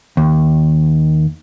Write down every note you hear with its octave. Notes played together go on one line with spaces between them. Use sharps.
D#2